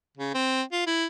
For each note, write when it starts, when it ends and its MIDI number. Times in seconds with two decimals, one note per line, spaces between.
0.18 0.34 49
0.34 0.62 60
0.72 0.84 65
0.87 1.05 64